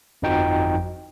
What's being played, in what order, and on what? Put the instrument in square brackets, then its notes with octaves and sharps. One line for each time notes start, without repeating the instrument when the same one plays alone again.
[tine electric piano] G1 F2 F3 D#4 F#4 G5